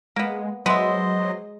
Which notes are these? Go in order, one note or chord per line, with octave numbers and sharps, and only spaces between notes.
G#3 A#3 B3
F#3 G#3 B3 C5 D#5 E5